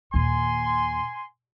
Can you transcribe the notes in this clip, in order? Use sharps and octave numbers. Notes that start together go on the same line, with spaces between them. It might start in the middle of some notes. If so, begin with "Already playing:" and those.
D#2 A#2 G#5 C6